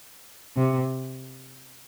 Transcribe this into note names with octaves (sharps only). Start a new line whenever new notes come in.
C3